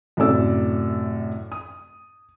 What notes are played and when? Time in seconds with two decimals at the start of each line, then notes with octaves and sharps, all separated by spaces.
0.17 F#2 A2 C3 A4 D5 E6
1.52 D#6